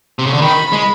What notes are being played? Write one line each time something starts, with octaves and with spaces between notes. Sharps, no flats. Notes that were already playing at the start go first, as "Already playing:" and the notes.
C3
C#3
D3
D#3 B5
G#3